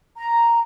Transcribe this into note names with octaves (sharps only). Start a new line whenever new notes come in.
A#5